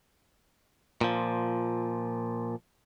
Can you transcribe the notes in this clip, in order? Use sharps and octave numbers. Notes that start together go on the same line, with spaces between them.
A#2 F3